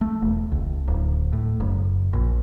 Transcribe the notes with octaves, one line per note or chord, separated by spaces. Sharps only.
A3
E1
C#2
D1
A2
F#1
A#1